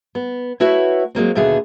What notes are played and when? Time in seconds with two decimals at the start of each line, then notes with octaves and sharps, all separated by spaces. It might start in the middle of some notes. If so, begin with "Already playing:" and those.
0.15 B3
0.60 A3 E4 F#4 B4 C#5
1.15 F#3 G#3 A#3 C4
1.35 D#2 B2 D3 A3 B3 G#4